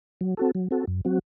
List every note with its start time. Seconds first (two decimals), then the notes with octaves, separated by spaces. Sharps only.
0.21 F#3
0.37 C4 F#4 A4
0.55 F#3
0.71 C4 F#4 A4
0.87 F#2
1.05 F#3 C4 F#4